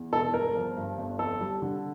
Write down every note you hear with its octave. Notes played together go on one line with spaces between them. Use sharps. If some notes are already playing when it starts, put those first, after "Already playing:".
Already playing: E2
E1 A4
G1 A#4
F3
G2
G1
F2 A4
G3
D3